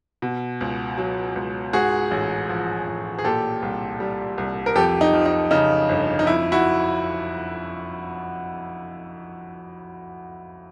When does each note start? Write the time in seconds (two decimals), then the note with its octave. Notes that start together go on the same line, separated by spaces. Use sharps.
0.22 B2
0.61 C#2
0.98 F#3
1.36 C#2
1.73 G#2 F#4 G#4
2.11 A1
2.49 F3
2.87 A1
3.19 G#4
3.24 A#2 G4 A4
3.62 C2
4.00 G3
4.38 C2
4.66 A#4
4.75 F2 G4 A4
5.01 D#4
5.13 F3
5.26 D#4
5.51 C#3 D#4
5.89 G1
6.19 D#4
6.26 F2 E4
6.52 E4 F#4